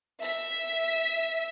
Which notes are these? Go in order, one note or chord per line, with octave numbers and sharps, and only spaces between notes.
E5 B6